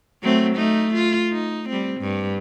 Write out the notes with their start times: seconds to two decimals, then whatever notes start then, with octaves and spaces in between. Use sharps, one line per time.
0.23 F#3 A3 C4
0.57 A3 D#4
0.94 F4
1.32 D#4
1.69 G3 C4
2.01 G2